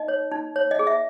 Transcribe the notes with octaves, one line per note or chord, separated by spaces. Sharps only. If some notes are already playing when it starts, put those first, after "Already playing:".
Already playing: D#4 D#5
C#5
D#4
C#5
D#5
G#4
E5